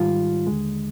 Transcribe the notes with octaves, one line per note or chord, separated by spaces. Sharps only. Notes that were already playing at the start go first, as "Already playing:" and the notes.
Already playing: G#2 D#3 G3 F4
D#2 D3 G#3